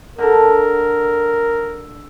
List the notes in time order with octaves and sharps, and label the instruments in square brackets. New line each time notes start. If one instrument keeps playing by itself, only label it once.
[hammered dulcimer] D3 A4 [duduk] A#4